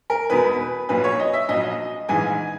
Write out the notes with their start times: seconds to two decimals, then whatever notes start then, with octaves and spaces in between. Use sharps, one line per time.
0.10 A#4
0.30 E1 E2 B2 B4
0.89 A#1 A#2 F#3 B4
1.04 C#5
1.19 D#5
1.33 E5
1.48 A#1 A#2 F#3 D#5
2.09 A#1 G#2 E3 G#3 G#5